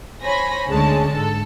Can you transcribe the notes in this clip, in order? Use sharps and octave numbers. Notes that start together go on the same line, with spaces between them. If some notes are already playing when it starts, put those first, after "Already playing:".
C5 C#5 G#5 B5 A#6
D2 D3 G#3 C#4 A5
G#2 A4